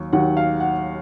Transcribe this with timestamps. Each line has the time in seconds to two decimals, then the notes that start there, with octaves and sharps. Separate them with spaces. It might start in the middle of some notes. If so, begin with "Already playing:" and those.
Already playing: D#2 F#3
0.13 D#2 D#3 F#3 F#5
0.37 F5
0.60 F#5